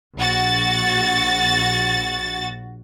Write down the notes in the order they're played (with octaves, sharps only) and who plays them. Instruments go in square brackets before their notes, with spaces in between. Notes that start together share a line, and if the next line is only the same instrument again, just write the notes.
[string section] A#1 F#4 A6